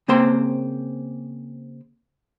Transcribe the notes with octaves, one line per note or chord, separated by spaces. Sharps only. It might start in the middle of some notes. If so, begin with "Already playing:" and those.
C#3 A#3 C4 C5 C6